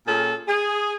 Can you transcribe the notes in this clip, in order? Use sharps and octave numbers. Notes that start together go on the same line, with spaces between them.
A#2 C#4 G#4 A4
G#4